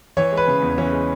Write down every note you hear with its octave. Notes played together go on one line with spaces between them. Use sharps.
E3 C#5
G#3
B4
C#3
E2
E3 C#4
G#3